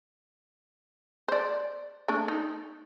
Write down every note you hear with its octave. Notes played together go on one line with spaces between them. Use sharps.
C5 D5
A3 D4
D#4